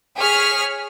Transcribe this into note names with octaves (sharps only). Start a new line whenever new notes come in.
G#4 C#5 F6 B6